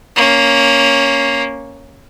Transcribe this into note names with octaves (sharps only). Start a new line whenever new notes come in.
A#3 C#4